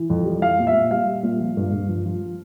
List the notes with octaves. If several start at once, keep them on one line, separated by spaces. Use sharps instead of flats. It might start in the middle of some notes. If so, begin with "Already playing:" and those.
Already playing: E3
F2
G3
G3 F5
A#2
E5
A#2
G3 F5
G3
A#2
F3
G2
G2
F3
F3